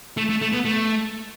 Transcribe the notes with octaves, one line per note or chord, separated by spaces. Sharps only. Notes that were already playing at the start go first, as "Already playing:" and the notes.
A3
A3
A3
B3
A3